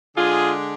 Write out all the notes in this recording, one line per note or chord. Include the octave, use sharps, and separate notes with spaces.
D3 G#3 D4 F4 G#4